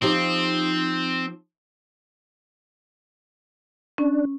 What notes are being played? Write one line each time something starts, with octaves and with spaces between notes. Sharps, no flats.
F3 C4 D#4 G4
C#4 D4